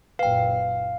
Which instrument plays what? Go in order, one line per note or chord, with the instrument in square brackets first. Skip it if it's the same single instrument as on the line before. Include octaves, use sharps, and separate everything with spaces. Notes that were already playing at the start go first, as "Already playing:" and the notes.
[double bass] F#1 A#2 [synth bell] B4 G5 [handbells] F5